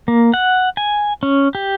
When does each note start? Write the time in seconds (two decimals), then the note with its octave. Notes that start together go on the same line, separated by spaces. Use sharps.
0.08 A#3
0.34 F#5
0.77 G#5
1.23 C#4
1.55 G4